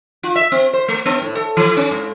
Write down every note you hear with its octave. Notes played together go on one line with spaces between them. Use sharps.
F4
E5
C4
C5
A3
B3
A2
A4
E3
C#4
G#2